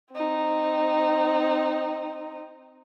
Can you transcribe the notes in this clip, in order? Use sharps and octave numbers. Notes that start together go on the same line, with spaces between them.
C4 D#4